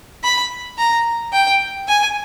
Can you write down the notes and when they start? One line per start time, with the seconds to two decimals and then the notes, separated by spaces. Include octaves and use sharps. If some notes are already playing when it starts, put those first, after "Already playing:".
0.23 B5
0.78 A#5
1.33 G5
1.88 G#5